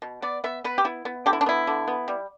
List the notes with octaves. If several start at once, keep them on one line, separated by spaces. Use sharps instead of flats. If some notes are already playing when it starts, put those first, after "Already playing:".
B2
B3 D5
B3 E5
B3 B4
G4
B3 E4
B3
D3 G4
E4
D4
B3 E4
D3
B3
G3